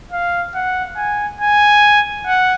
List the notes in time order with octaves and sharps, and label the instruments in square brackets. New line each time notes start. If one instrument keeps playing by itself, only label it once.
[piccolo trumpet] F5
F#5
G#5
G#5
F#5